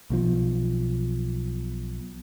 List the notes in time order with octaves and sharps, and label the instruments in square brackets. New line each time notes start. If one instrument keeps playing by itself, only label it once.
[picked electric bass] B1 B2 F3